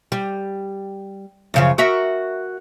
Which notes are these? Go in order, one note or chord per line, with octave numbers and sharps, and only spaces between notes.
G3
F#2 C#3 F3
F#4 A#4 E5